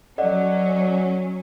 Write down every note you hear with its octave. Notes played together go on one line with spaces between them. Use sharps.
F#3 C#4 A4 D5 D#5 F#5